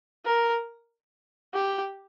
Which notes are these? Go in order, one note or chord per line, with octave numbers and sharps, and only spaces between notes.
A#4
G4